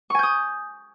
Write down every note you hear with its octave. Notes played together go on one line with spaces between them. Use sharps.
G#5 C#6 D#6 G6